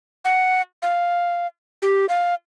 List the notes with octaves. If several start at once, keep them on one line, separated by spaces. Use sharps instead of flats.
F#5
F5
G4
F5